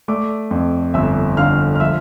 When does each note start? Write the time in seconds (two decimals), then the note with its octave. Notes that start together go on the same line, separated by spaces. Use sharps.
0.08 A3 D5 D6
0.51 F2
0.94 G1 E5 E6
1.37 D3 F5 F6
1.76 F6
1.80 F3 E5 E6